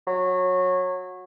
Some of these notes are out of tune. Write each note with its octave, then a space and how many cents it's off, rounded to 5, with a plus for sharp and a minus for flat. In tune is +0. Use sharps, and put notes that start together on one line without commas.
F#3 -20